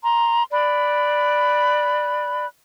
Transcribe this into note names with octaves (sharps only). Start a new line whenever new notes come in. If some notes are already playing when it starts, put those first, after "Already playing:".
A#5 C6
D5 B5 F#6